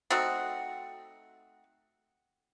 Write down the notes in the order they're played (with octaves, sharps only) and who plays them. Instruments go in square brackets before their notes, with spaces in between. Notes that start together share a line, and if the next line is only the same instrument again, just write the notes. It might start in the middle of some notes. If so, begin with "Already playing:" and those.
[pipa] A3 C4 D#4 F#4